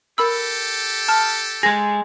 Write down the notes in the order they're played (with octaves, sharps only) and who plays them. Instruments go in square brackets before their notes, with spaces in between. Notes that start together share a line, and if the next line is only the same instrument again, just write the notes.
[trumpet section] G4 A4 [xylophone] A#4 B5 E6
[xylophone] A5 F6
[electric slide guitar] G#3 G#4 [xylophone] A#6